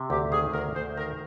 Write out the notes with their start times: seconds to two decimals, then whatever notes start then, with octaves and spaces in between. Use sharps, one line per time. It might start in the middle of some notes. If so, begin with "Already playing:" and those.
Already playing: C3
0.10 D2 G4
0.32 D#3 G#4
0.54 D2 A#4
0.76 D2 C5
0.97 D#3 A#4